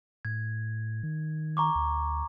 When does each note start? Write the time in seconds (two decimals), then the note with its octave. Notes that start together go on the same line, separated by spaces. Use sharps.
0.25 A2 G#6
1.03 D#3
1.57 A#5 C#6 D6
1.75 D2